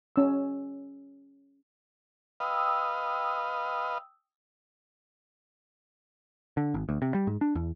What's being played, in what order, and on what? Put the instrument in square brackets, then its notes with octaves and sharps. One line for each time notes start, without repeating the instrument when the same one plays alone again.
[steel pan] C#4 E6
[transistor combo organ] B4 D#5 F5 [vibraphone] G5 D#6 E6
[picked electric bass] D3
G#1
D2
C3
G3
G#2
D4
E2